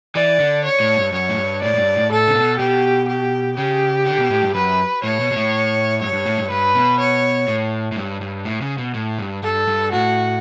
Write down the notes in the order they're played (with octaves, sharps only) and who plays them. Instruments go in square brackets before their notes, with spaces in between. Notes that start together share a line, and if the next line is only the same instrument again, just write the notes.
[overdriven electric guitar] E3 [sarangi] D5
[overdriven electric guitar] D3
[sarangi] C#5
[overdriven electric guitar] A2
G2
[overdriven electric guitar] F#2 [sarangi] C#5
[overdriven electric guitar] A2
G2
[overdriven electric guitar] A2 [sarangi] D5
[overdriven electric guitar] A2
G2
A2
[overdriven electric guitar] A2 [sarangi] A4
[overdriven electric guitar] C#3
B2
[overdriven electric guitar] B2 [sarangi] G4
[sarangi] G4
[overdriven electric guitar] C#3 [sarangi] G4
[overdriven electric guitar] D3
B2
A2
G2
[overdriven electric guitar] F#2 [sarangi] B4
[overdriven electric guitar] A2 [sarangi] C#5
[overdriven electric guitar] B2
B2
A2
[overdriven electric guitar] G2 [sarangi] C#5
[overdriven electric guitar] G2
A2
G2
[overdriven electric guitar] G2 [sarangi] B4
[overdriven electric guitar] B2
[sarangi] C#5
[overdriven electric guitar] A2
A2
G2
G2
A2
C#3
B2
A2
G2
[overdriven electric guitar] G2 [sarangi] A4
[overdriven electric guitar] G2
[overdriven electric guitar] A2 [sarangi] F#4